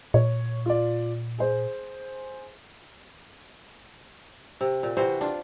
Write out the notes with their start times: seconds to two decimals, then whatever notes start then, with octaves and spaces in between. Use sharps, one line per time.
0.14 A#2 C#5
0.66 F4 D5
1.38 G#4 C5
4.61 C3
4.83 A#2
4.97 C3 E3 F#4 C5
5.21 D4 F4